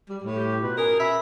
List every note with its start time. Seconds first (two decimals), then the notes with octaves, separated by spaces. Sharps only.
0.09 G3
0.24 A2
0.36 G4
0.62 B2 F4 F#4 B4
0.77 B2 C#4 G#4 A#4
0.99 E5 B5